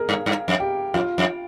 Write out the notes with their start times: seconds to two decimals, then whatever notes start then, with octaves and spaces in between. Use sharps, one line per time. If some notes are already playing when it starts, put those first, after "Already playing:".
Already playing: G#4 A#4
0.09 G2
0.26 G2
0.48 F2
0.60 G4
0.94 F2 F4
1.18 F2